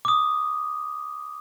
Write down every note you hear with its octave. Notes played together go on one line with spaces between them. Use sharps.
D6 D#6